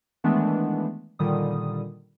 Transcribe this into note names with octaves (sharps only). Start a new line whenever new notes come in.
D#3 E3 G#3 A3 B3 D4
A#2 D3 D#3 G3 D#6